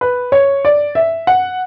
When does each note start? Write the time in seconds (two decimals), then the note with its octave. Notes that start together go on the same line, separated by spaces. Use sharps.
0.01 B4
0.32 C#5
0.65 D5
0.95 E5
1.27 F#5